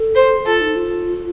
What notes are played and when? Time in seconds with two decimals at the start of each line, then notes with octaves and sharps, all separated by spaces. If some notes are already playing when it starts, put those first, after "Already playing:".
Already playing: A4
0.15 C5
0.46 F4 A4
0.61 D#4
0.76 F4